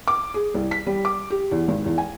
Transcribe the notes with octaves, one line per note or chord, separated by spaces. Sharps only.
D6
G#4
C2
B6
G3
D6
G4
E2
G#1
E2
G#5